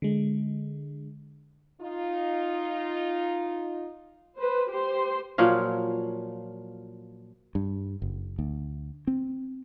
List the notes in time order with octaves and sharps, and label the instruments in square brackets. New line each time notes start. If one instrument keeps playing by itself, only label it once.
[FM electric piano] D3 G#3
[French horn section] D#4 F4
[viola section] B4 C5
G4 C5 C6
[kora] A#2 F3 F#3 F5
[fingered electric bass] G2
F#1
D2
C4